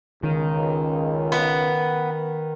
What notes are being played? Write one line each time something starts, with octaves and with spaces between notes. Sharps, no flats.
C#2 D#3
B3